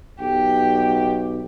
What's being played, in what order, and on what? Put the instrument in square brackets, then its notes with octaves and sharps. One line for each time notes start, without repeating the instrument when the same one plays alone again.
[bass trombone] B1 [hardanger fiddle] G4